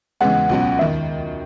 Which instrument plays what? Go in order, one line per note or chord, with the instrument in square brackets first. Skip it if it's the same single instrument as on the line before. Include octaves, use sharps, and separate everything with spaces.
[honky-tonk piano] C#3 E3 G#3 B3 [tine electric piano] F#5
[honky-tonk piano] C#2 B2 F#3 C#4 F#4
[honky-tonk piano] D#3 [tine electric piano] E5